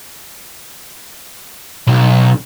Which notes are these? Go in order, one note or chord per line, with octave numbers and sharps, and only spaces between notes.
B1